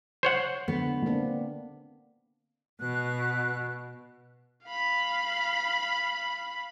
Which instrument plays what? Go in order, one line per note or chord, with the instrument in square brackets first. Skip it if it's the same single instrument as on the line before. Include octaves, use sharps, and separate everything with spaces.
[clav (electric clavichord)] C5 C#5 F#5
[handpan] D3 [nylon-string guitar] B3
[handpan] A#3 C4 D4
[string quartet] B2 [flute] F#6
[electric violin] F5 B5